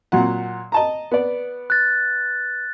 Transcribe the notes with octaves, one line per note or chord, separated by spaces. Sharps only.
A#2 F#3 F#5
D#5 A5 A#5
B3 D5
F#6 A6